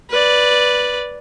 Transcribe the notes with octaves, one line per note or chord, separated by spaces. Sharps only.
B4 D5